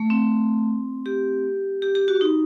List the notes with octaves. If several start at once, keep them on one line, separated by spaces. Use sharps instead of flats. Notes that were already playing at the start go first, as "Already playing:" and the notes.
Already playing: A3
C4
G4
G4
G4
F#4
D#4